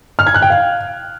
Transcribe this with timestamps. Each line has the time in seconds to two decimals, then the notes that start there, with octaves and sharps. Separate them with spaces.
0.19 F6
0.27 G#6
0.34 F#6
0.42 G5
0.50 F5